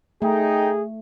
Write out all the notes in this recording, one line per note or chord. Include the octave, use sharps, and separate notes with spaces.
A3 D#4 G#4 G5